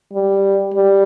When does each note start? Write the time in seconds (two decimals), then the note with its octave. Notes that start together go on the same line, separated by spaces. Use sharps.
0.13 G3
0.74 G3